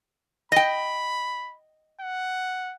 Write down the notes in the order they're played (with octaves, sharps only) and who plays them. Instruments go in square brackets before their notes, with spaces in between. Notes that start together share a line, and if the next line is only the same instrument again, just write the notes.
[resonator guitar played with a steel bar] D#5 G5 [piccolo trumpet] B5
[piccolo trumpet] F#5